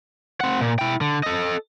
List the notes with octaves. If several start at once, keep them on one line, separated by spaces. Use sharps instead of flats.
C4 F#5
A#2
E4 G5
D3
A4 D#5